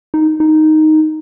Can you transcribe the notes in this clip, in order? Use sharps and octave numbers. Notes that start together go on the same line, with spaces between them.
D#4
D#4